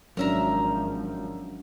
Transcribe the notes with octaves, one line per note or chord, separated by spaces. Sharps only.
G#1 F3 F#3 C#4 D4 A#4 E5 A#5